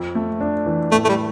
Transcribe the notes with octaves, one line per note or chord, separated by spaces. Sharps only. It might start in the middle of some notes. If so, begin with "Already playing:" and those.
Already playing: F2
A3
D4
E3
A2 A3
A3
G3